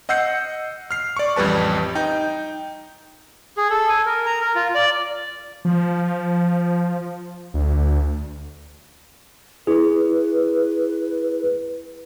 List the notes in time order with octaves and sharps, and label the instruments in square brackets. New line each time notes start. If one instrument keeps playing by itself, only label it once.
[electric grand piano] D#5 F#5 E6 G6 C7 C#7
F6 C7
D5 C#6
A1 F2 G3 B4 A5
D#4 G5
[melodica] G#4
A4
G#5
A#4
A#5
A#4
F4
D5
[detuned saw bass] F3
D2
[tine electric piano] E4 G#4 [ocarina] B4